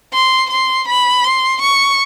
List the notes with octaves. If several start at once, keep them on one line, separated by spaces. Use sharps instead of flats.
C6
C6
B5
C6
C#6